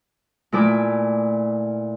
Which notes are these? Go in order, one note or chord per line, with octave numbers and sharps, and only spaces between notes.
A#2 A3 E4 D5 G#5 D6